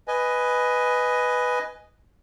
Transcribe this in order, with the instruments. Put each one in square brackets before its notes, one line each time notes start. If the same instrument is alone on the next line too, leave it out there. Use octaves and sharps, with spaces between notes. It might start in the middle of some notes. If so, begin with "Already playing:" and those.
[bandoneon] B4 D#5 G#5